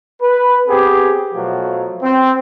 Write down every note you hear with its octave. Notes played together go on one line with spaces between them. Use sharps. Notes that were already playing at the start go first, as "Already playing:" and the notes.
B4
B3 C4 G4 G#4
B2 F3 F#3 A3
C4